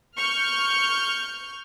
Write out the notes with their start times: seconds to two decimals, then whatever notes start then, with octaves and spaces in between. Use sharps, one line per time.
0.17 C#6 F6 G6